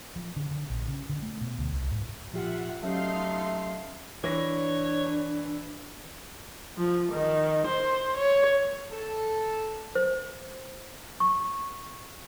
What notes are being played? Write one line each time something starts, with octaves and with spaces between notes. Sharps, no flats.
F3
D3
D3
A#1
C#3
D3
A3
B2
D2
C2
G#2
A#2 F3 F4 G4 E5 F#5
F#3 A3 C#4 D#4 G4 F5 C6
E3 D4 C#5 A#6
F3
D#3
C5
C#5
A4
C5
C#6